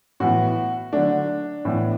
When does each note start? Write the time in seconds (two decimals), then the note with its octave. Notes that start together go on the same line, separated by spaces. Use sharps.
0.20 A2 E3 B3 F#4
0.93 D3 F#3 A3 D4
1.65 A2 E3 B3